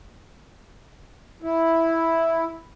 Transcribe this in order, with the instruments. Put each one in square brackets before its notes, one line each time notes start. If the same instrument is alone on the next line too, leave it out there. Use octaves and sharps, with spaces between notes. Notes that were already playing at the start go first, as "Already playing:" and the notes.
[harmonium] E4